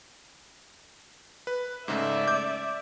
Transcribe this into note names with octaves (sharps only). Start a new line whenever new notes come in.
B4
G#2 C#3 A3 D5 E5
D6 G6